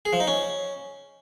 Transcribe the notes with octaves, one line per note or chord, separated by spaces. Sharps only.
G#4
F3
D#4
C#4